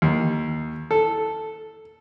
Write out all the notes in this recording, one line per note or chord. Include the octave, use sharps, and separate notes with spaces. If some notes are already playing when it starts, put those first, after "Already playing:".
D#2
A4